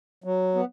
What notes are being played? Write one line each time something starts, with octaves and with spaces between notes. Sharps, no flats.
F#3
B3